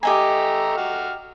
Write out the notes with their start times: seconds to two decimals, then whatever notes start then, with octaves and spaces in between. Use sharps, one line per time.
0.03 A3 G4 D#5 G#5 A#5
0.77 F#4 F6